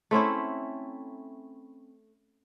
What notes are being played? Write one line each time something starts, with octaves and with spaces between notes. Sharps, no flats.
A3 C4 C#4 E4